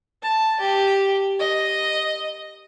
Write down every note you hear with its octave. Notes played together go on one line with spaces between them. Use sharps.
A5
G4
D#5